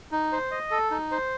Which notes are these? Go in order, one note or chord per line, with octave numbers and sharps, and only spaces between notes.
D#4
C5
D#5
A4
D#4
C5